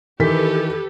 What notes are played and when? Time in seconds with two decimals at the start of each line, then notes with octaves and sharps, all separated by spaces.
0.20 D#3 E3 G4 A4 B4 B6